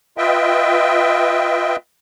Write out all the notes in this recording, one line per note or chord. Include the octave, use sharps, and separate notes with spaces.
F4 B4 D#5 E5 G5